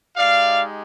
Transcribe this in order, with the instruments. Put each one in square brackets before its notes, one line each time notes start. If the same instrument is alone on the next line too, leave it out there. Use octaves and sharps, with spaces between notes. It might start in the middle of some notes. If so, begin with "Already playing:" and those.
[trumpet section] G#3 D#4 G4 D5 F5